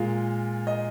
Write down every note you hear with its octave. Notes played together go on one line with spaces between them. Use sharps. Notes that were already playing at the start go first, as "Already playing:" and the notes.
Already playing: A#2 G#3 F4
D#5